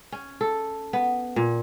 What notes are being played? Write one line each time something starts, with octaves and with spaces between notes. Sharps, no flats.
C#4
A4
B3
A#2